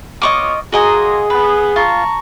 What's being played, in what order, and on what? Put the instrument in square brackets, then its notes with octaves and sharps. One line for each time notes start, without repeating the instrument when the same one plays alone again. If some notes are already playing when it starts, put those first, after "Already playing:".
[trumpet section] B3 F4 C#5 [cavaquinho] D#5 C#6 D6
[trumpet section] A#3 A#5 C6 [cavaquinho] F#4 D#5 G#5 [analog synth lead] G#4
[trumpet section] B3 [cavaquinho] B4
[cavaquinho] F4 [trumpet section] A5 A#5 C#6